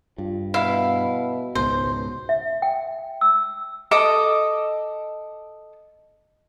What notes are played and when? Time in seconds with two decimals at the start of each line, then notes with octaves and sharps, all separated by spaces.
0.18 G2 F4
0.54 B2 E4 F5
1.55 C#2 G#2 B2 C5
2.29 E5
2.62 G5
3.21 E6
3.91 A4 D#5 D6